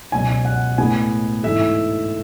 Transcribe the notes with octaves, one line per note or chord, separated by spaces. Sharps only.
C#2 B2 F#3 G#5
F#5
A2 G#3 B3 G#5
G#2 E3 A3 E5